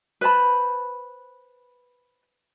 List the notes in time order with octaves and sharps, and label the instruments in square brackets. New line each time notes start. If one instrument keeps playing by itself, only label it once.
[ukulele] B4 C5 A5 B5